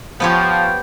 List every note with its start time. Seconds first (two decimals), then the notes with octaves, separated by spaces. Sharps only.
0.20 F3 B3 G4 C#5 G5